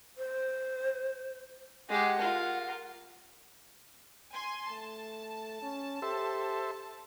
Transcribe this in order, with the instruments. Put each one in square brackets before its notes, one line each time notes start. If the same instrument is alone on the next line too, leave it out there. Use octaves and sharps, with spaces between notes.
[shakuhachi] C5
[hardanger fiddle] G#3 G4 [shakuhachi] F#5
[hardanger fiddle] F4 A#4
[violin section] G#5 C6
[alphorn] A3 [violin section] A5
[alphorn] C#4
[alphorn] G4 [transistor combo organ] A4 C5 E5